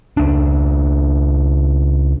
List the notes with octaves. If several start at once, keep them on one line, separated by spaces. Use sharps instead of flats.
C#2 D4